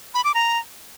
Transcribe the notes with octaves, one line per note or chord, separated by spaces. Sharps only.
B5
D6
A#5